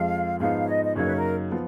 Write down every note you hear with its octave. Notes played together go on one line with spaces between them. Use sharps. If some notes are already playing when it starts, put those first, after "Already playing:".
Already playing: F2 F3 G#3 F5
G#2 F3 B3 D#4 F5
C#5
D#5
D#5
F#2 C#3 F#3 A#3 D#4 C#5
B4
A#4
F3 B3 F4